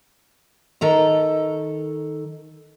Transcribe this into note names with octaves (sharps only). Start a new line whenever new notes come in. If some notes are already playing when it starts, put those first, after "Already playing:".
D#3 A4 A#5